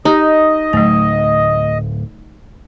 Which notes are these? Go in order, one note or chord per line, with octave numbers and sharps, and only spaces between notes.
D#4 G4 D#5
D1 F#3 A3